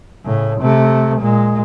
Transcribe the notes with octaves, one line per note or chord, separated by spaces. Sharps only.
A2 C#3
C3 A3
A#2 G#3